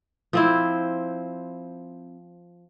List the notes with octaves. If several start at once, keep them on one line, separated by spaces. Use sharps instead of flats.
F3 C4 E4